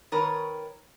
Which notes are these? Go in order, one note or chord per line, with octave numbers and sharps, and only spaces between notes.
D#3 A#4 B4 C#5